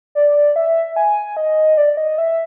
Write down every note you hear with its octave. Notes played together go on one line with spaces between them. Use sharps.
D5
E5
G#5
D#5
D5
D#5
E5